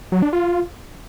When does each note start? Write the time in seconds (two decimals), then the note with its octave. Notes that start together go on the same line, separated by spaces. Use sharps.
0.12 F#3
0.22 D4
0.33 F4